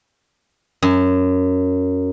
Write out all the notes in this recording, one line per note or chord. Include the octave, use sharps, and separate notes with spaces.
F#2